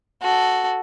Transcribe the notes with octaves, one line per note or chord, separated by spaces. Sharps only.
F#4 A4